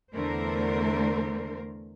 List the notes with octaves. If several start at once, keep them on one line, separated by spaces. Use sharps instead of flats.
E2 D3 A3 A#4 C5